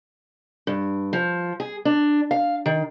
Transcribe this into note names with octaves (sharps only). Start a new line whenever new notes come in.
G2
F3
G#4
D4
F5
D#3